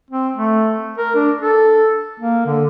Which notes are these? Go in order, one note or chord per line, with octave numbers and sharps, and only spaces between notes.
C4
A3
A#4
D4
A4
A#3
D3